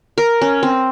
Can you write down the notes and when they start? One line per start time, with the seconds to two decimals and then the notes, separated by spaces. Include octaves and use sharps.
0.18 A#4
0.42 C#4
0.63 C4